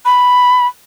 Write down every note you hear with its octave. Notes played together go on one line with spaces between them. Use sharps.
B5